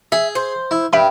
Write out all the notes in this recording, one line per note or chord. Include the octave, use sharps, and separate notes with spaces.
G#4 E5
C5
E4
G2 E5 G5 B5